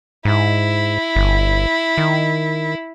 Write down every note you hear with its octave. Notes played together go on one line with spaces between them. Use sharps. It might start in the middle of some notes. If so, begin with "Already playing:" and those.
G#2 E4
G1
D#3